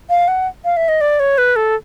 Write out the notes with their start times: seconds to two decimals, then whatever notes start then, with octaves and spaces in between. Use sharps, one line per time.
0.10 F5
0.28 F#5
0.65 F5
0.77 E5
0.88 D#5
1.01 D5
1.20 C#5
1.38 B4
1.56 A4